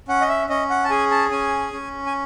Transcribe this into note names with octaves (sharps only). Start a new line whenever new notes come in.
C#4 F#5
D#5
E5
C#4 D#5
F#5
A5
G#4 G#5
A5
C#4 G#5
C#4
G#5